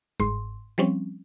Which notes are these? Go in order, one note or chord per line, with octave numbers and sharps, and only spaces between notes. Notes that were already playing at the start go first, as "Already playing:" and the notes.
G1 G#2 C6
F3 G3 C4 C#4